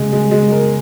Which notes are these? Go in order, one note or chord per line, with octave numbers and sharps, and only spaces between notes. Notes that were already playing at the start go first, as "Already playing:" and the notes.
Already playing: C#3 G#3
G#3
G#3
A#4